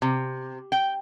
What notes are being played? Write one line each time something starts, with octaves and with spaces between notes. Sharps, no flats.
C3
G5